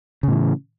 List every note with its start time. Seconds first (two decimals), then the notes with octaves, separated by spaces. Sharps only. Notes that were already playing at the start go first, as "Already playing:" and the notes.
0.23 C#3
0.28 A2
0.32 E3